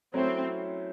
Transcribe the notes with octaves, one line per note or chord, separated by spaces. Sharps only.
F#3 A3 C4 C#4 E4 C5